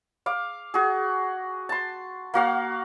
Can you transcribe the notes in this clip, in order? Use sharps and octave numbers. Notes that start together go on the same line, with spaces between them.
F5 D6
F#4 G#4
A5 C6
A#3 F#4 F5 F#5